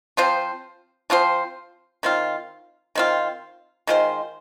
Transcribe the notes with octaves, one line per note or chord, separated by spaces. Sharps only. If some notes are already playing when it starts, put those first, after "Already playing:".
F3 C4 F4 C5
F3 C4 F4 C5
D#3 C4 F4
D#3 C4 F4
D#3 G#3 F4 C5